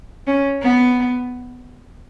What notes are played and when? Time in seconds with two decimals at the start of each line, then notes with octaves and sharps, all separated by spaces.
0.27 C#4
0.62 B3